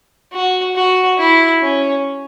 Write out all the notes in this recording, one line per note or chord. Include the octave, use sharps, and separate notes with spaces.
F#4
F#4
E4
C#4